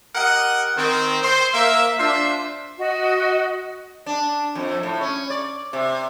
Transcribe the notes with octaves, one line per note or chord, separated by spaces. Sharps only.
G4 A#4 D#5 F#5
D#3 C4
C5
A#3 E5
D4 F4 C5 E5
F#4 D#5
D4
F2
A2
C#4
D5
C3